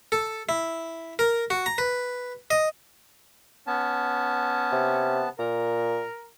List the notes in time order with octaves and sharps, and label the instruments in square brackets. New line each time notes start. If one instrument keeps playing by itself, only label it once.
[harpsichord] A4
E4
A#4
F#4
A#5
B4
D#5
[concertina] B3 A5 [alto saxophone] C#4
[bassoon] C3
[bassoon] A#2 [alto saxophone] A#4